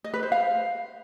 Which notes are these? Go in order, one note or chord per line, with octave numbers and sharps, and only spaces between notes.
D#5
B4
C5
F5